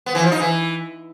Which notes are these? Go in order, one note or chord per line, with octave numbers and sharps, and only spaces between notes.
B3
E3
F3
D#4
E3